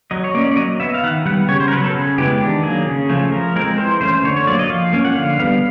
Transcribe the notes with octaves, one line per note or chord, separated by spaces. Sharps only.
F#3 D#5
C#5
A#3 C#4 D5
D5
F#3 D#5
B3 E5
F5
D#3 F#5
G3 B3 F#5
C#3 C#5
C5
A#4
F#3 B3 B4
A4
C#3 G#4
E3 G#3 B3 G4
D#3 D4
F#3 A#3 G#4
C#3
F3 A3 C#4
F3 A#4
G#3 C4 A#4
E3 C5
A3 C#4 C5
D3 C#5
C#5
F#3 A#3 D5
D#5
F3 F5
A#3 C#4
F#5
D3 F5
G3 B3 F5